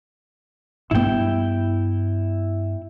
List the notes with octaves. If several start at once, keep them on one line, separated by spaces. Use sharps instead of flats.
G2 B3 E4 G5